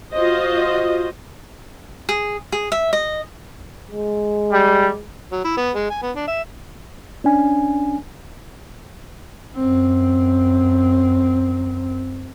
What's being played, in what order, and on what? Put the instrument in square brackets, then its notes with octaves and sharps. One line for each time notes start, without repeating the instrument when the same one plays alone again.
[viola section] F4 F#4 C5 D#5
[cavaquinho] G#4
G#4
E5
D#5
[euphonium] G#3
[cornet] G3
[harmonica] F#3
E4
B3
G#3
G#5
B3
D4
E5
[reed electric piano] C#4 D4 G#5
[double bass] F#2 C4